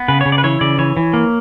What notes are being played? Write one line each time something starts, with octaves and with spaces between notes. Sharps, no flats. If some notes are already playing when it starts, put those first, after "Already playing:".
Already playing: B3
C#3 B4
C#3 C#5
D5
B4
E3 C#5
C#3 D5
E3 C#5
E3
A#3